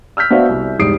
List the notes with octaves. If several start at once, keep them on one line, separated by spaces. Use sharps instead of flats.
E6 F6 G6 B6
B3 D4 F#4 C5 E5 F5
C2
E1 G#2 G3 D#6 C7 D7